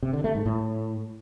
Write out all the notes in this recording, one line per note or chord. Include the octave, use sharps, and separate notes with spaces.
C3
D3
A3
G#2
A2